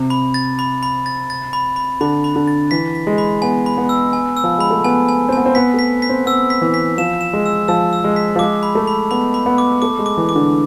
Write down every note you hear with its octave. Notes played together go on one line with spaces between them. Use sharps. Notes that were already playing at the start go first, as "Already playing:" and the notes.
Already playing: C3
B5
A6
B5
B5
A6
A6
B5
B5
D3 B5
B5
D3
A6
E3 B6
B6
G#3
B5
B3 G#5
B5
B3
E6
G#5
E6
F3
G#3 B5
A3
B3 G#5
G#5
C4
B3 G#5
C4
B3 B6
A3 B6
B6
C4
B3 E6
B6
E3
B6
F3 E7
E7
G#3
E6
F3 E6
E6
G#3
B6
F3
G#3 D6
B5
A3
B5
B3 B5
B5
B3
D6
A3 D6
G#3
D6
E3
D6
D3